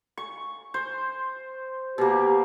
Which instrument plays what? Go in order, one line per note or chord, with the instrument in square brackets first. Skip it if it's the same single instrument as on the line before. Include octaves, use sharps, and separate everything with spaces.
[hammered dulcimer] C#6
C5
[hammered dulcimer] B2 A#3 [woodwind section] G4